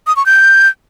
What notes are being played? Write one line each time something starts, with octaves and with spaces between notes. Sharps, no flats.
D#6
C#6
G6